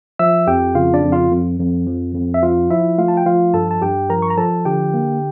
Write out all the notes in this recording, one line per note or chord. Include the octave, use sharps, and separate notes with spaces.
F3 E5 E6
F2 G4 G5
C#3 F4 F5
D4 D5
F2
F4 F5
F2
F2
F3
F2
E5
F3 F4 F5
F3 E4 E5
A3 F4 F5
A5
G5
F3 F4 F5
G2 A4 A5
A5
G2 G4 G5
F3 A#4 A#5
C#6
A#5
F3 A4 A5
D3 G4 G5
A#3